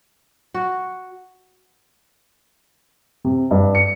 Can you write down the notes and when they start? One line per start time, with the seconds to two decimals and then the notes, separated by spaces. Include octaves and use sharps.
0.54 F#4
3.25 C3
3.51 G2
3.75 C#7